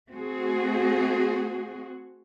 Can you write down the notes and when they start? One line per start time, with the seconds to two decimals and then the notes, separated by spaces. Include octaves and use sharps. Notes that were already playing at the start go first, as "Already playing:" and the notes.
0.11 A3 C4 F#4 G#4